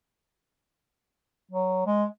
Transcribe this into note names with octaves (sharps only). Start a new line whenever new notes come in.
F#3
G#3